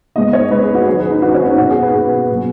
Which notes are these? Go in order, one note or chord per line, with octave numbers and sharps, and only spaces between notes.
C#3 G#3 B3 D#5
C#5
C#3 G#3 B3 B4
G#4
F#4
D#3 F#3 C#4 G#4
B4
D#4
D#3 F#3 C#4 F#4
C#4
C#4
B2 B3 F#4
G#4
B4
B2 B3 G#4
B2 F#3 B3